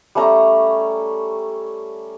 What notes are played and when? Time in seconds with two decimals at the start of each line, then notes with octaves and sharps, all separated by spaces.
0.15 G3 A3 C#4 A#5